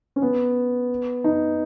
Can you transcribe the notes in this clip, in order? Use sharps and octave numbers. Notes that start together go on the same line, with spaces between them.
C#4
B3
D#4